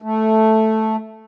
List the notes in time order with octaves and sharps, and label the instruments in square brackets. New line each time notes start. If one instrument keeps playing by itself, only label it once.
[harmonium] A3